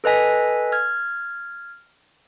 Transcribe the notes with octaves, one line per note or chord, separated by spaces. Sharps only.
A4 B4 D#5 G#5 B6
F6 G#6